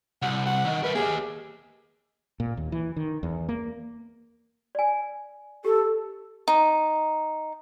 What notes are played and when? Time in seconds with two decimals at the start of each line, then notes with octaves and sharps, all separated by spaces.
0.22 C2 F#5
0.46 F#5
0.66 D#3
0.83 A#4 B4 E5
0.95 A#3 G4 G#4
2.40 A#2
2.57 D#2
2.72 E3
2.96 D#3
3.23 E2
3.49 A#3
4.75 D5 G#5
5.65 G4 A4
6.48 D#4